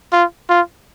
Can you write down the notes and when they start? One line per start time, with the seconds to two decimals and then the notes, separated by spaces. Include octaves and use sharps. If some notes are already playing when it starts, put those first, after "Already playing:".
0.13 F4
0.49 F4